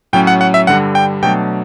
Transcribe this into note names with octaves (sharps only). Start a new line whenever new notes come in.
A2 F#3 C#4 G5
F#5
F#5
E5
G2 D3 G3 F#5
G5
B2 F#3 A3 D4 G5